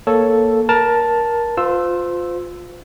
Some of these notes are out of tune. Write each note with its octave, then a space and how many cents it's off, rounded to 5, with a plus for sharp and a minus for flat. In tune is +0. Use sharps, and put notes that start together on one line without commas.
A#3 +0 A4 +0 C#5 +0
A#4 +20 A5 +0
F4 +15 C5 -35 E6 +0